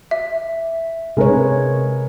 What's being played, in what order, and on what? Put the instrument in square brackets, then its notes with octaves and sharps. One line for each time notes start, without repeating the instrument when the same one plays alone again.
[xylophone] E5
[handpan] C3 C#5 [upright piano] G#3 A#4 B4